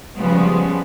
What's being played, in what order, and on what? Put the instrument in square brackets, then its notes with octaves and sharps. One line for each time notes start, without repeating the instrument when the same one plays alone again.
[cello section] C#3 F3 G3 G#3 B3